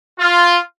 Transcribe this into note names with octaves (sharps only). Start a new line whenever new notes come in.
F4